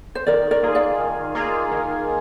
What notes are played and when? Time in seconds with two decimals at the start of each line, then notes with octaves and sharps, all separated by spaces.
0.15 C5
0.26 D#3 A#4 D5
0.51 A#4 D5
0.63 A#3 F4 G#4
0.75 D5 F5
0.99 D#3
1.35 A#3 F4 G#4
1.72 D#3